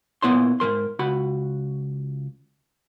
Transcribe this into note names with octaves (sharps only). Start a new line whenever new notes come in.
A#2 D#3 B3 E4 C#5 C6
G#2 F#3 A#4 C6
C#2 F#4 B5